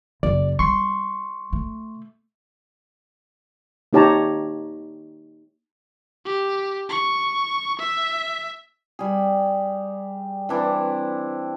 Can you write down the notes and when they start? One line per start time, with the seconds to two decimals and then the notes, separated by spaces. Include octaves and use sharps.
0.23 F#1 D5
0.59 G3 C6 C#6
1.53 A3
3.93 A#3 D#4 G4 C#5 A5 A#5
6.25 G4
6.89 C#6
7.79 E5
8.99 G3 G#4
10.49 E3 C4 D4 E4